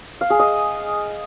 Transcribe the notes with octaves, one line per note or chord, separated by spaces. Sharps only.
F5
G#4
D#5